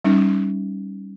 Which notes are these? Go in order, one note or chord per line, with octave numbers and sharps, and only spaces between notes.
G3 C#4 D#4